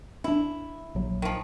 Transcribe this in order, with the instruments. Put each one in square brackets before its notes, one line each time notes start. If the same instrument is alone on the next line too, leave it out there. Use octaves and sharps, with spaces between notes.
[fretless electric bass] C#4 D4 [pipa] E4
[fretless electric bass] A#1 F#3
[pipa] D#3 F3